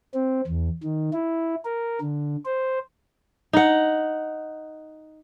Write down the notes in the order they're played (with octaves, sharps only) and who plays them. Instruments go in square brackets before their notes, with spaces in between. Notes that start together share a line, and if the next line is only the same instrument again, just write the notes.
[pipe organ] C4
E2
D#3
E4
A#4
D3
C5
[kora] D#4 F#5